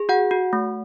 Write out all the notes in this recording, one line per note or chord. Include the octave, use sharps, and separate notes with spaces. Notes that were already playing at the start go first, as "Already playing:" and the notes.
Already playing: G#4
F#4 F#5
F#4
A3